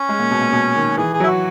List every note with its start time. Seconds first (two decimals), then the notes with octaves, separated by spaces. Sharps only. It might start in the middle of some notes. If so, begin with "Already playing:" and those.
Already playing: C#4
0.09 G#3
0.19 A#2
0.31 B2
0.41 A#2
0.53 B2
0.76 D#3
0.97 E3 G#4
1.13 G#4
1.20 F#3 E4
1.27 F#4